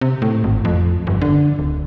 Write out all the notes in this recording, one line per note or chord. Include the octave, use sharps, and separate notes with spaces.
C3
A2
G#1
F2
G1
D3
D1